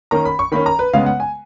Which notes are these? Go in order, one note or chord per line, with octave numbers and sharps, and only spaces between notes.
D#3 A#3 C#4 A#5
B5
C#6
D#3 A#3 C#4 B5
A#5
B4
C#3 G#3 B3 F5
F#5
G#5